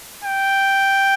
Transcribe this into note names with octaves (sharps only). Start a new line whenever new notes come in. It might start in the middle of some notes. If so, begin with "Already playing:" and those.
G5